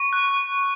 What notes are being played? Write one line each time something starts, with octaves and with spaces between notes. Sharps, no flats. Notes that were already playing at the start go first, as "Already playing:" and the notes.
Already playing: C#6
F#6